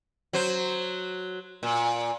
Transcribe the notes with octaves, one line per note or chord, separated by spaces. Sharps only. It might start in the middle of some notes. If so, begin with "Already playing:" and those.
F#3 C5
A#2